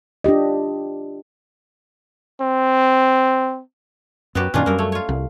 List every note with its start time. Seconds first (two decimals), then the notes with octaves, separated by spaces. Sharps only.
0.24 D4 F4 G4 D#5
2.41 C4
4.35 F#2 B3 F#4 G4
4.54 F#2 A#2 D#3 C#4 D4 F4
4.66 F#2 G3 A#3 C4 A#4
4.78 A3 C#5
4.92 F4 C#5
5.09 C2